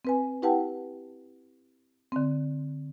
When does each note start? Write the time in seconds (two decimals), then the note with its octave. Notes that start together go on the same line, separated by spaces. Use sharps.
0.05 C4 B4 G#5
0.42 E4 G4 B4 F#5 G5 A5
2.12 D3 C4